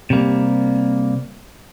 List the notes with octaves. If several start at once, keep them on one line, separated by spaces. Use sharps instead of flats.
C3 G3 A#3